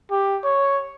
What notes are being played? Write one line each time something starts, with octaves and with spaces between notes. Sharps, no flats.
G4
C#5